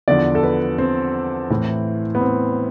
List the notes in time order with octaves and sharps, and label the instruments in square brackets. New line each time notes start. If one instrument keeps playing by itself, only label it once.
[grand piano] E2 D3 F3 D5
A4
B4
C4
A2 E3
B3
C4